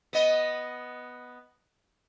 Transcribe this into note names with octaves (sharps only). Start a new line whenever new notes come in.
B3 D#5